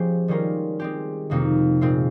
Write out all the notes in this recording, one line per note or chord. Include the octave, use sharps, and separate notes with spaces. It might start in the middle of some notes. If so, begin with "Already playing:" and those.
Already playing: F3 G#3 C#4 G4 C5
D#3 G3 C#4 F4 A#4
G#3 C4 G4
F2 C3 D#3 A#3 D#4
A#2 G#3 C4 F4